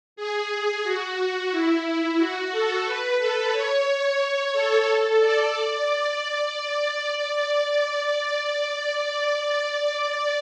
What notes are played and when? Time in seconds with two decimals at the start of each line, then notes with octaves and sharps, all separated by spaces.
0.16 G#4
0.84 F#4
1.51 E4
2.18 F#4
2.51 A4
2.85 B4
3.18 A4
3.52 C#5
3.86 C#5
4.19 C#5
4.53 A4
5.20 D5
5.87 D5